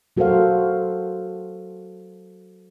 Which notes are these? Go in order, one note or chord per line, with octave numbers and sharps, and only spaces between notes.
F#3 F#4 A4 A#4 C5 F5